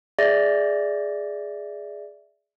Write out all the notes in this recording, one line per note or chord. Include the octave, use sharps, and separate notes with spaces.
G#4 D5 E5 A6 A#6